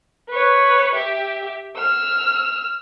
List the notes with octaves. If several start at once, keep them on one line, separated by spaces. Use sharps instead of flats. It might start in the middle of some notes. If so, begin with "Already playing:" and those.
B4 C#5
G4 E5
E6 F6